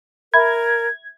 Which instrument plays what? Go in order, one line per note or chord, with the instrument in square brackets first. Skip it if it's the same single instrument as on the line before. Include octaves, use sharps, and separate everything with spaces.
[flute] A#4 [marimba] E5 B5 [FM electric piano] G#6